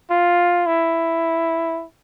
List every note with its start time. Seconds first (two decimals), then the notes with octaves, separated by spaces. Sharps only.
0.11 F4
0.67 E4